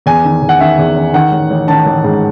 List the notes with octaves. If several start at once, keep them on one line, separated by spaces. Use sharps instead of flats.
E2 G#5
D#3
E2
F#5
D#3 E5
E2
D#3
D#3 F#5
A1
A1
D#3 A5
A1
G#2